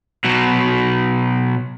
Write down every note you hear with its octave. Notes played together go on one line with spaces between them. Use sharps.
B2 F#3